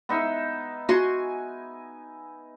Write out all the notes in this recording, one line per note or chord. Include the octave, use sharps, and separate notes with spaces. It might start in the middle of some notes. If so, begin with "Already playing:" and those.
B3 D#4 E5
F#4 G#5 C6